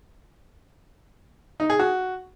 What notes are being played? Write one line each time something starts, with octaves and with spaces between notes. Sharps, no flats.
D#4
G#4
F#4